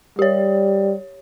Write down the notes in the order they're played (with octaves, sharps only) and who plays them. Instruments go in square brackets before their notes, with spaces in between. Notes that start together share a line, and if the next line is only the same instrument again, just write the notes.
[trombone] G3 [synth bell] G4 C#5